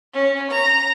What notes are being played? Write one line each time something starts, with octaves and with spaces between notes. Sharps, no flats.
C#4
A#5